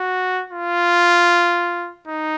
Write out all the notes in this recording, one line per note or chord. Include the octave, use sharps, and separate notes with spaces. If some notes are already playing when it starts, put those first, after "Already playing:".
Already playing: F#4
F4
D#4